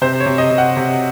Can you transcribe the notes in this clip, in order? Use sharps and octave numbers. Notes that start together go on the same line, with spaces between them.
C3 C5
C#5
C3
D#5
C3
F#5
C3